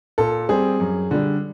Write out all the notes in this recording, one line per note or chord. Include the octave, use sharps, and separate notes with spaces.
A#2 A4
G3 C4 G#4
F#2
D3 G3